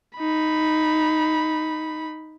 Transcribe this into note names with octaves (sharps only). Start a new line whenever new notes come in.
D#4 B5